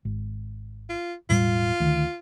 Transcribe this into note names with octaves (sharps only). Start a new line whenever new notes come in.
G#1
F4
E1 A2 G3 F4
D2 D#3